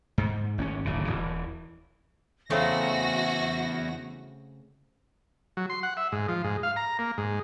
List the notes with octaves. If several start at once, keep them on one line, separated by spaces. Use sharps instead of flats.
G#2
G#1 C4 C#4
D1 G#1 C#3
D#1 E3
E2 C#3 A3 C4 F#4 E5 A#6
F#3
C6
F#5
E5
G#2
F3
G#2
F5
A#5
A#3
G#2